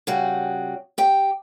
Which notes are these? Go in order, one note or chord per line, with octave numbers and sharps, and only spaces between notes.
C#3 G3 F#4
G4 G5